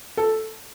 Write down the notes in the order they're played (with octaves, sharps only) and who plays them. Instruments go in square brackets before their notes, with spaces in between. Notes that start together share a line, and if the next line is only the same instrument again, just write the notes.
[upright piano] A4